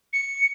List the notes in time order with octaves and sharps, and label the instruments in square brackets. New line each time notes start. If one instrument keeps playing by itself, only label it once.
[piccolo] C#7